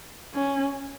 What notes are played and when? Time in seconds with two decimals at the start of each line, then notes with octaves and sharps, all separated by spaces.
0.34 C#4